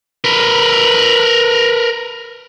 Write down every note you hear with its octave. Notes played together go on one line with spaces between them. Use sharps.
A#4 B4